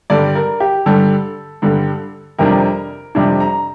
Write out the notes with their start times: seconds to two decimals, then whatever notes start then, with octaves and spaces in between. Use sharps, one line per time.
0.10 G2 D3 G3 D5
0.35 A#4
0.60 G4
0.86 G2 D3 G3 A4
1.62 G2 D3 G3
2.38 F2 C3 G3 D4 A#4
3.15 F2 C3 G3 D4
3.40 A#5